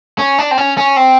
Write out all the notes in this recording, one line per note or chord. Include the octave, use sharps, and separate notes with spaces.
C#4
D4
C4
C#4
C#4
C4